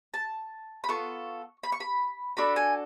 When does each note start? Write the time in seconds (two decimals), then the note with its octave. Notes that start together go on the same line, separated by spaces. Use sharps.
0.14 A5
0.84 B5
0.89 B3 F4 A4 C#6
1.63 B5
1.72 C#6
1.80 B5
2.37 D4 F#4 A4 B5
2.56 G#5